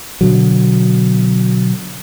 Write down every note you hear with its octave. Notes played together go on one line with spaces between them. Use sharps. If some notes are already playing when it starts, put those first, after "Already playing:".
B2 D3 F#3